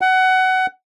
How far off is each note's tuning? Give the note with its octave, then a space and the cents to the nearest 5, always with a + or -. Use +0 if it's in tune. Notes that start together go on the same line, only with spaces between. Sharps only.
F#5 +20